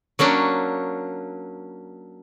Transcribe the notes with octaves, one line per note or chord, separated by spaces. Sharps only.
F#3 A#3 C#4 D4